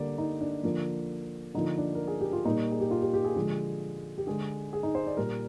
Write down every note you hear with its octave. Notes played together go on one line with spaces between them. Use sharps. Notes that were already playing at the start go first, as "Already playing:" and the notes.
Already playing: D3 G3 A#3 D5
D#4
D4
D3 F3 A#3
D3 F3 A#3 D#4
D4
A#4
G#4
G4
F4
A#2 G3 A#3 D#4
G#4
G4
F4
G4
G4
G#4
D3 F3 G#3
G4
D3 G#3 G#4
G#4
D#4
C5
D5
A#2 G3 A#3 A#4